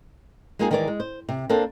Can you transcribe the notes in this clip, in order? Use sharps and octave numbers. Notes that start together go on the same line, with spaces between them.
G#3 A#3 C4 D#4 F4 G#4
D#3 E3 G#3 A#4 C5 D5
G#3
C5
C3
A#3 C4 D4 A4 A#4 C5